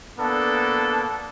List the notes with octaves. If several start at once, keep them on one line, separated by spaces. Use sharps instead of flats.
A#3 B3 D4 A4